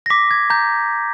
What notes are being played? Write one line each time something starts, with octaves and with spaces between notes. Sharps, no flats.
A#6
D6 B6
G#6
A#5 G6